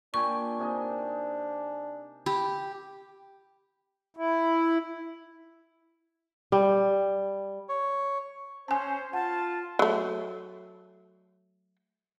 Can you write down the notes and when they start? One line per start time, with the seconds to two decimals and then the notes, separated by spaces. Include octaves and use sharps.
0.14 A#2 D4 G5 G#5 C#6
0.59 C3 D#4 G#5
2.26 G4 B5
4.17 E4
6.52 G3
7.69 C#5
8.68 C#4 C5 G#5 A5
9.13 F4 F#5 A5
9.79 F#3 A3